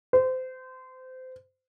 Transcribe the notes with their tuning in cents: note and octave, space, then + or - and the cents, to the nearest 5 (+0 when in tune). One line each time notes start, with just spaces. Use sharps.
C5 -25